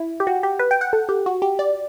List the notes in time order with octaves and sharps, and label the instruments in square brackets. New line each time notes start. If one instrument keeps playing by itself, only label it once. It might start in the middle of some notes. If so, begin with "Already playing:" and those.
Already playing: [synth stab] E4
G4
F#4
G4
B4
G5
F#5
A4
G4
F#4
G4
D5